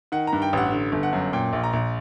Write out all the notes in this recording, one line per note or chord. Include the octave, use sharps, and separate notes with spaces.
D#3 F#5
A#5
G2
G5
A1 F#5
D3
G1
F#5
F#2
A#2 G5
A#1
A#5
A#1